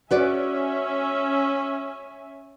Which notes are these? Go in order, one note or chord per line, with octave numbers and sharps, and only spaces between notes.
C#4 F#4 B4 D5 E5 G#5